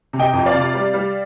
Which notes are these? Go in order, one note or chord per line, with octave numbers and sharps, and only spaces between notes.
C3
D#5 G5
F2
D5 F5
C3
G3
G3